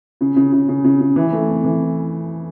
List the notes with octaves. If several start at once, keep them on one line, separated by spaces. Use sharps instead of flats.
C#3
C#3
C#3
C#3
C#3
C#3
E3
A3
F2
E3